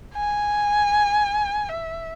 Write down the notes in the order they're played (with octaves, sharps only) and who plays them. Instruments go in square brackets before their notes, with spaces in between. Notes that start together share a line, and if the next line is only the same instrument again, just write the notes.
[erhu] G#5
E5